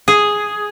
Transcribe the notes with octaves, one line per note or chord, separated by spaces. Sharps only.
G#4